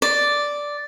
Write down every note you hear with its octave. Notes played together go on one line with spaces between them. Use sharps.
D5